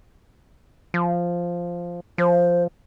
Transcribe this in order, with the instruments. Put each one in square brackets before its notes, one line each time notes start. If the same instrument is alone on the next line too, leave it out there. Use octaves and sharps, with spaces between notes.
[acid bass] F3
[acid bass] F3 [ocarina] C5